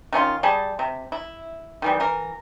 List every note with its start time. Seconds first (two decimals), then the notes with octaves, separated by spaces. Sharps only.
0.13 D#3 C#4 E4 F4
0.43 G3 G#4 A5
0.79 C3
1.12 E4
1.82 D#3 E3 G3
2.00 E3 A#4